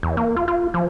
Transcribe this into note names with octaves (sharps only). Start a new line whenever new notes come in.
E2
A#3
F4
F4
F3